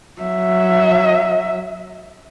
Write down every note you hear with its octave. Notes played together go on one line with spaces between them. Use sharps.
F#3 E5